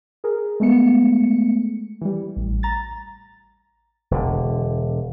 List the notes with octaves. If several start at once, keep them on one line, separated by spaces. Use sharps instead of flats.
G#4 A#4
G#3 A3 B3 C#7
E3 G3
A1
A#5 A6
E1 D3